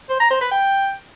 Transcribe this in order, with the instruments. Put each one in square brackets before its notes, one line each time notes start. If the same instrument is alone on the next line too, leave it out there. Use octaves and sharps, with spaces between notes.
[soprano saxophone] C5
A#5
C5
B4
G5